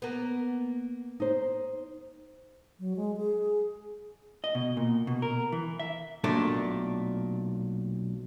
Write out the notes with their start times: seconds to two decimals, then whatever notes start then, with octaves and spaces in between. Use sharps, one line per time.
0.02 A#3 B3
1.20 D#4 C5
2.79 F#3
2.96 G#3
3.17 G#4
4.44 D#5
4.55 B2
4.77 A#2
5.07 B2
5.22 A#4
5.52 E3
5.79 E5
6.24 B1 A#2 A3 D4